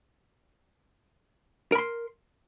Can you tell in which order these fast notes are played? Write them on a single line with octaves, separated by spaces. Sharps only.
A#4 B5 C6